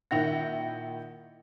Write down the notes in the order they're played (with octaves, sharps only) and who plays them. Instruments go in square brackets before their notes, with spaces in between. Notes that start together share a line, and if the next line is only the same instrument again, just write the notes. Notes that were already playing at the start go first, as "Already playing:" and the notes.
[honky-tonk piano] A#2 D#3 E4 E5 F#5 A#6